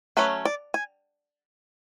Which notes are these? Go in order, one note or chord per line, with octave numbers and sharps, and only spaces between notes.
F#3 A3 C#4 B4
D5
G#5